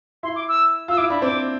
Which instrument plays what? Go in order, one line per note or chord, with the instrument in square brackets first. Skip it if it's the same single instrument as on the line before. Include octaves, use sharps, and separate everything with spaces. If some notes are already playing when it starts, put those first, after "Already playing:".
[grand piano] E4 [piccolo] C6
[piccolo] D6
E6
[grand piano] F4 [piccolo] E6
[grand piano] E4 [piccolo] D6
[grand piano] D4 [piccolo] B5
[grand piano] C4 [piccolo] D6